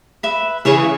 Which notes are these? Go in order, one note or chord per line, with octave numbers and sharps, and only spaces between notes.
B4 E5 B5
C#3 E3 G#4 C#5 E5